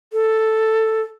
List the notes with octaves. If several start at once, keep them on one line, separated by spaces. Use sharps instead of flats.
A4